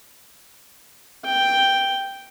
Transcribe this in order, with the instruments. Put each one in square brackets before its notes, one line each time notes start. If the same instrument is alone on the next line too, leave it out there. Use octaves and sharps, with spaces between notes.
[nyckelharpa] G5